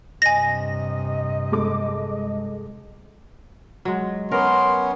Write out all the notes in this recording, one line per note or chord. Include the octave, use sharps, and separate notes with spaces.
G2 C3 D#5 G#5 A#6
G#3 A4 D6
F#3 G#3
B3 C#4 A#4 C6